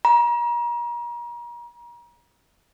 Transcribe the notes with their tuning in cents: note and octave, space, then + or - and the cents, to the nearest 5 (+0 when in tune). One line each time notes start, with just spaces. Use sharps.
A#5 +35